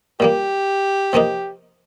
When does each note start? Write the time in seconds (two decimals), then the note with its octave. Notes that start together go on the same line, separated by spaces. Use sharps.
0.20 A#2 G3 A#3 G4
1.13 C3 F3 A#3 D#4